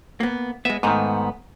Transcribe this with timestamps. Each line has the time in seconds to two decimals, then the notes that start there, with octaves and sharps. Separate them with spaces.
0.20 A#3 B3
0.65 G#3 B3 E5
0.83 G#2 D#3 A3 B3